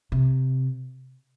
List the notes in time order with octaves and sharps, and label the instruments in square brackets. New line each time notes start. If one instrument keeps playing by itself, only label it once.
[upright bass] C3